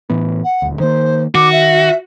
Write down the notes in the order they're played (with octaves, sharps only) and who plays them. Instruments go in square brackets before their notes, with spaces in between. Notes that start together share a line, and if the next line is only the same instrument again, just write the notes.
[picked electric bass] A2 E3 B3
[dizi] F#5
[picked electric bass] D#1 D2
[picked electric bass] D#3 A#3 [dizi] C5
[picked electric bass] D#3 [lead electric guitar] F#4 [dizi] D6
[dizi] E5